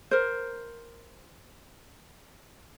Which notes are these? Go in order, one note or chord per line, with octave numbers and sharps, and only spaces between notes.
A#4 C5